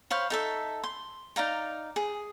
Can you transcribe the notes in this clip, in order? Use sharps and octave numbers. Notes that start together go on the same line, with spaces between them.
C5 C#5 F5 B5
D#4 A4 E5
C6
D#4 D5 F5 A#5
G#4